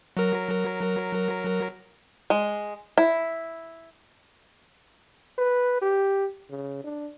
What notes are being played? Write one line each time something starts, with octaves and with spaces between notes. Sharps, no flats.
F#3 A#4
G#3
E4
B4
G4
C#3
D4